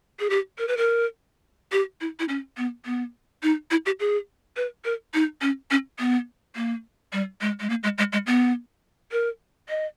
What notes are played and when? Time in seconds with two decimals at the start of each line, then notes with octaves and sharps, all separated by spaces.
0.20 G#4
0.30 G4
0.58 A#4
0.68 B4
0.77 A#4
1.72 G4
2.01 E4
2.20 E4
2.29 C#4
2.57 B3
2.86 B3
3.43 D#4
3.71 E4
3.86 G4
4.00 G#4
4.57 B4
4.85 A#4
5.14 D#4
5.42 C#4
5.71 C#4
5.99 B3
6.56 A#3
7.13 G3
7.41 G#3
7.60 G#3
7.70 A#3
7.83 G#3
7.98 G#3
8.13 G#3
8.27 B3
9.12 A#4
9.69 D#5